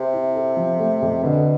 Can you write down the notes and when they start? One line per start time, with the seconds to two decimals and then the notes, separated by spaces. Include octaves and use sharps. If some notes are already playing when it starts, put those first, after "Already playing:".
Already playing: C3
0.13 E4
0.35 A4
0.57 F3
0.79 A3
1.02 F2
1.23 B2 D3